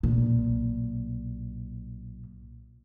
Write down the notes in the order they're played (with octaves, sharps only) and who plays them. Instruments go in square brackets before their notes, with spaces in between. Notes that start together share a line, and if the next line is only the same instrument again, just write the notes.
[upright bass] B1 A#2